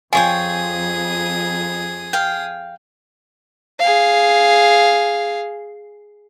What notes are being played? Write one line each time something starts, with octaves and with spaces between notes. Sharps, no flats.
F2 F4 G#4 C#5 G5 G#5 D#6
F5 G5
G#4 F5